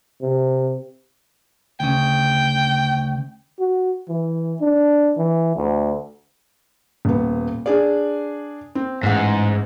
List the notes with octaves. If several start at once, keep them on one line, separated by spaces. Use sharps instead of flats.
C3
D2 C#3 G5
F#4
E3
D4
E3
D2
D#1 B3
D4 G#4 D5
C4
A1 G#2 F#5